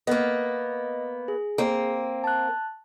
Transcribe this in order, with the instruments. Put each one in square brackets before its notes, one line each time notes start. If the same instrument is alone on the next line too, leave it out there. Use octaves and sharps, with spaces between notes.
[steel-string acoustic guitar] A#3 B3 [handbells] D#5
[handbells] G#4
[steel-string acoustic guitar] A#3 C4
[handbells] A5 F#6